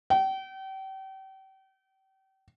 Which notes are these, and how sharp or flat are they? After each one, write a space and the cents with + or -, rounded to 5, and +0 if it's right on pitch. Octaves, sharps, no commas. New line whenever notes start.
G5 -35